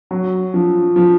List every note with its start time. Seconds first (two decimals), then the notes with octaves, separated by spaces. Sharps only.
0.11 F#3
0.54 F3
0.96 F3